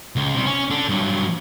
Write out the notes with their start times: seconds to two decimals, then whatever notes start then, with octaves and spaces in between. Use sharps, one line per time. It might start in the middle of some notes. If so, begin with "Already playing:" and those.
0.16 C#2
0.34 C3 G3
0.45 C#4
0.70 D4 A4
0.89 G2 F#3